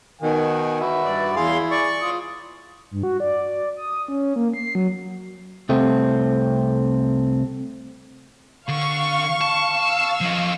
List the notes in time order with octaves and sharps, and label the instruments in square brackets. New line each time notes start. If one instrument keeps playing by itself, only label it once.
[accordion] B2 D#3 [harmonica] F#5 G#5
[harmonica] F#4 B4 E5
[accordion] G2 D5
[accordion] E2 F5 C6 [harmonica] E4 G#4
[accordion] D5 C#6
[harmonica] F4 D#6
[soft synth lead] G2
F#4
D5
D#6
C#4
A#3
C7
F#3
[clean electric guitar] C2 A3 C4
[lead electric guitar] D3 [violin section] F5 C#6
[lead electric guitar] A5
[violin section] F5 C#6 E6
[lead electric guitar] F3 D#5